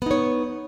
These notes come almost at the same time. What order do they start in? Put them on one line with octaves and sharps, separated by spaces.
B3 D#4 C#5